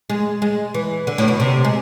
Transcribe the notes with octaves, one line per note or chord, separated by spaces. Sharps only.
G#3
G#3
E3
D3
A2
B2
C3
G#3